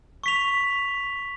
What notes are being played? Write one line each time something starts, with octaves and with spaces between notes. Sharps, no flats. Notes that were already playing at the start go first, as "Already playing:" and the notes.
C#6 B6 F7